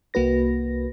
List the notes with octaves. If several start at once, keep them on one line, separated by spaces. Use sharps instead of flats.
C2 A#3 F#4 B4 A#6